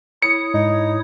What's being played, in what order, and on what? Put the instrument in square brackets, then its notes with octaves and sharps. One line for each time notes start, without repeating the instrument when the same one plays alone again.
[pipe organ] E4 C#5 D#6 [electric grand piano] C#7
[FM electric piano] G#2 [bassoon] D#4